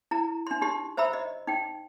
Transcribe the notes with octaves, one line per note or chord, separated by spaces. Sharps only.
E4 A#5
D4 C6
D#4 G4 C6
C5 E5 A#5 B5 E6
D#5
D#4 G5